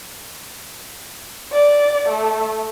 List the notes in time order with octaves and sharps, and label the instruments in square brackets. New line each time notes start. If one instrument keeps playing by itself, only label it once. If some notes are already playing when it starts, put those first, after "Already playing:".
[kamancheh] D5
A3